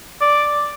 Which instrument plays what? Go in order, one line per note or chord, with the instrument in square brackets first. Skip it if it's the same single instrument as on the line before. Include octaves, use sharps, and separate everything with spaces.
[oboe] D5